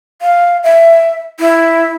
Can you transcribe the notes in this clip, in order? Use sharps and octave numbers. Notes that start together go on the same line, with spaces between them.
F5
E5
E4